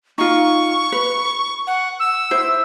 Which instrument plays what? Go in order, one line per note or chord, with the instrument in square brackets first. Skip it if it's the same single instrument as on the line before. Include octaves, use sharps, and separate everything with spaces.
[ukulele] D#4 F4 [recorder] C#6
[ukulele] B4
[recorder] F#5
E6
[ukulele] E4 C5